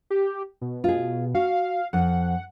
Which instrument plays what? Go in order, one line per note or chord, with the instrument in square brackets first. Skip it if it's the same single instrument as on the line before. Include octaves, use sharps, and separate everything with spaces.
[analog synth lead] G4
B2
[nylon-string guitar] F4 G#4
[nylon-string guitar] F#4 [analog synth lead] F5
[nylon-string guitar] F2 [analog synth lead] F#5